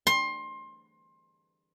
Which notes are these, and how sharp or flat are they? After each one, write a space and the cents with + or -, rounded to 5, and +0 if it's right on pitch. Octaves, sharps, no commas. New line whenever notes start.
C6 +25